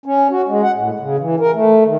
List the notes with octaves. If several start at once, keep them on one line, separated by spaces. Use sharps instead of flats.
C#4
F#4
G#3
F#5
A2
C#3
E3
A#4
A3
D#3